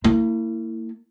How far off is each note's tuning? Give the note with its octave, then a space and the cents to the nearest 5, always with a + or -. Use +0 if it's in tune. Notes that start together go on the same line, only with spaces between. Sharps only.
A#3 -40 E4 +0